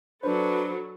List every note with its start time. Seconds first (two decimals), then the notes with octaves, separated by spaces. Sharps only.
0.23 F#3 D4 A4 B4 C5